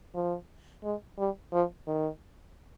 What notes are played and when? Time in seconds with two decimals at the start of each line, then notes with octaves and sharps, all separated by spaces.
0.15 F3
0.84 G#3
1.18 G3
1.53 F3
1.87 D#3